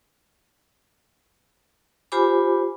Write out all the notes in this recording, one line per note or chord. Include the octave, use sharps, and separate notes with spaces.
F4 G4 C5 G#5 B5 D6